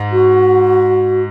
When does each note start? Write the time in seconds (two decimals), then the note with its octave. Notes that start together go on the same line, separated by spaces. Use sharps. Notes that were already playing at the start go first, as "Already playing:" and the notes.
Already playing: G#2
0.12 F#4